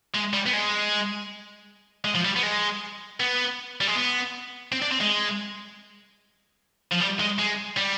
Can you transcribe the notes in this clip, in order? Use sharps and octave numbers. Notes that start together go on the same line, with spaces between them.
G#3
G3
B3
G#3
G#3
F3
G3
B3
G#3
B3
G3
G#3
B3
C4
D4
C4
G#3
F3
G3
G#3
G#3
G3